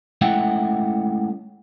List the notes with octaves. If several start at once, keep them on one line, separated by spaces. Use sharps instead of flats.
G#3 A3 C#4 E4 F#5 G5